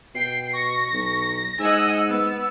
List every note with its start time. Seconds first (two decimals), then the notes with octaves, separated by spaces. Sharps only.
0.15 B2 G5 C7
0.53 C#6 A#6
0.93 B1
1.59 G#2 D#5 F#5 G#5 E6
2.09 B3